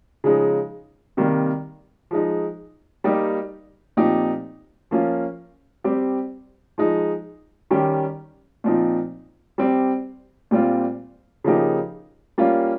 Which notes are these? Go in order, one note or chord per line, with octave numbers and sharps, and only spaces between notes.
C#3 F3 G#3 D#4
C3 D#3 G3 A#3
F3 G#3 D#4
G3 A#3 D#4 G4
A#2 F3 C4 D#4 G4
F3 A#3 C#4 F4
G3 C4 G4
F3 G#3 D#4
D#3 G3 C#4 G4
A#2 F3 C4 D#4
G3 C4 G4
A#2 G3 C4 F4
C#3 F3 A#3 D#4 G4
G3 A#3 C#4 F4